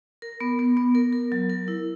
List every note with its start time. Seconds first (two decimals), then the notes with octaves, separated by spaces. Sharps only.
0.22 A#4
0.40 B3
0.59 B3
0.77 B3
0.95 A#4
1.13 A#4
1.32 F#3
1.50 A#4
1.68 E4